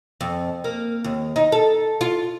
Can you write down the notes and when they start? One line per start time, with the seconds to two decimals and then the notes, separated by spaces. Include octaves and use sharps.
0.21 F2
0.64 A#3
1.04 D#2
1.36 D#4
1.52 A4
2.01 F4